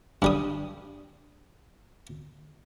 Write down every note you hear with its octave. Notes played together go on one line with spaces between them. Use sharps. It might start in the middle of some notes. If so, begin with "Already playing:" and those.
G2 G3 D#6